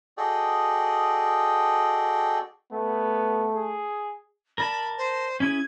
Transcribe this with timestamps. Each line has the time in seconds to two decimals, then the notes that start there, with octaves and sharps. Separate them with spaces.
0.18 F#4 G#4 A4 D5 D#5 G5
2.73 A3 B3
3.55 G#4
4.58 A#4 D5 A5 B5
4.98 C5
5.40 C#4 E4 G#4 G#6